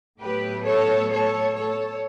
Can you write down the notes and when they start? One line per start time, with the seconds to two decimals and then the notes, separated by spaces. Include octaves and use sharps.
0.19 A2 F#3 B3 G4 B4
0.64 A4 C#5
1.10 A4 C#5
1.55 A4 C#5